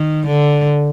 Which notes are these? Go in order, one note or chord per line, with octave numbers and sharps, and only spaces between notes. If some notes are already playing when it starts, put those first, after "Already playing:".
Already playing: D#3
D3